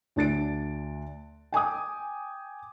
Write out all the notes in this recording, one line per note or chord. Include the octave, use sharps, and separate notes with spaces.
D2 D4 A6 D7
G5 G#5 D6 D#6